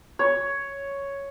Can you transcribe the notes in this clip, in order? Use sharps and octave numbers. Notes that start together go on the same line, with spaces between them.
C#5